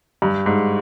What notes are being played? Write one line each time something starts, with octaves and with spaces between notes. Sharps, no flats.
G2
G#2